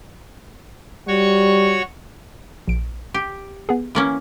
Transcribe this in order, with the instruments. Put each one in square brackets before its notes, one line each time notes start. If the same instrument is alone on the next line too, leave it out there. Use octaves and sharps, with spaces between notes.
[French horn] G3 [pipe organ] F#4 C#5 C#6
[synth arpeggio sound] A#1 D7
[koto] G4
[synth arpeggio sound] B3 G#4
[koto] E3 A#3 C#4